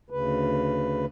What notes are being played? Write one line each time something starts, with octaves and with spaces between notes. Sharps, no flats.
D2 C#3 B4